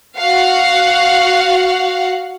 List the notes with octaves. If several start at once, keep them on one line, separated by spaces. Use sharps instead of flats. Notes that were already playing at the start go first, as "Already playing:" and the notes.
F#4 F5 F#5